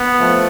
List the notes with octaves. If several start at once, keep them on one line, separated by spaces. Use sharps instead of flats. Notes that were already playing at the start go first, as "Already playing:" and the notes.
Already playing: B3
F3 A3